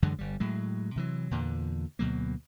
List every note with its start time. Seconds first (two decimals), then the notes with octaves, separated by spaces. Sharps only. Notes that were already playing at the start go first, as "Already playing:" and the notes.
0.02 F#2 D3 E3 G#3
0.19 G1 G3
0.40 A2 F#3 G#3
0.96 C3 E3 F#3
1.31 E2 A#2 D3
1.99 D2 B2 F#3 A#3